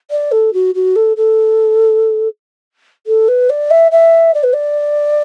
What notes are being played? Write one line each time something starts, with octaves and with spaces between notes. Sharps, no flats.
D5
A4
F#4
F#4
A4
A4
A4
B4
D5
E5
E5
D5
B4
D5